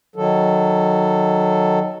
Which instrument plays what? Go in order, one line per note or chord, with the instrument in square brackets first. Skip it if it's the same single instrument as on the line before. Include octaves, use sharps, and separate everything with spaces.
[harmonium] D#3 F#3 A4